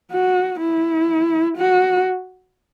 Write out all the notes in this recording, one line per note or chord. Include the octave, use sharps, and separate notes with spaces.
F#4
E4
F#4